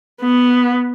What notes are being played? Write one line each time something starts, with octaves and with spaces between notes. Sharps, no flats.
B3